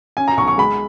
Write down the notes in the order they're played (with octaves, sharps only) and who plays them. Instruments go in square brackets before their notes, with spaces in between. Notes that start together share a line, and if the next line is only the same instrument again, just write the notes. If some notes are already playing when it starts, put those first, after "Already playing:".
[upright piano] C#4 G#5
A#5
B1 C#6
C#6
G#3 B5